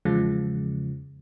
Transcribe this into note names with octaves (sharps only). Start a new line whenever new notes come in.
E2 C#3 F3 G#3